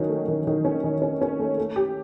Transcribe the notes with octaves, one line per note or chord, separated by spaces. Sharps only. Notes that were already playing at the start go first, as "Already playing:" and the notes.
Already playing: D#3 F#3 C#4
A3
D#3
D#3
C#4
D#3
C#4
C#4
A3
A3
G4